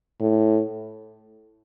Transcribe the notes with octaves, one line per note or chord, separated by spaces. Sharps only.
A2